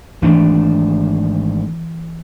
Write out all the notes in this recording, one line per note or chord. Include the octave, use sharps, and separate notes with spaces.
G#1 E3 A3 D4